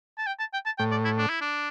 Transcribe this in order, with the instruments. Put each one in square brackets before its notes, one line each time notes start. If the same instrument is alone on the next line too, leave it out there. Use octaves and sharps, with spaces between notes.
[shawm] A5
G5
A5
G5
A5
[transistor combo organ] A2 [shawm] G5
[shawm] D5
E4
D4
E4
D4